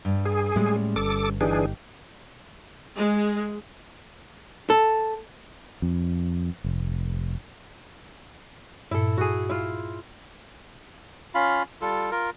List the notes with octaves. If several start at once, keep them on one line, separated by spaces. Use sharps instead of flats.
G2
G#4
A2 G3 G#3 C#4
G1 A4 D6
E3 D4 D#4 G4 G#4
G#3
A4
F2
F1
G2 A#2 E4 A4
F#4 G#4
E4 F4
C#4 F4 F5 B5
G3 F4 A4
F4 A#4